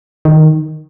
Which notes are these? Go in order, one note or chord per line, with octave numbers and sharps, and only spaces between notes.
D#3